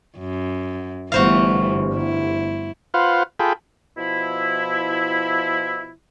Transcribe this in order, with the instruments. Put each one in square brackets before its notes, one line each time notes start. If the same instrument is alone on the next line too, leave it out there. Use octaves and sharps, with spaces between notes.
[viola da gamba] F#2
[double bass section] G1 [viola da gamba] E3 A3 [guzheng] F#4 C5 F5
[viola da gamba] E4
[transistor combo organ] F4 B4 C5 F5 F#5
F4 G#4 A4 G5 B5
[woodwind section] B2 F3 E4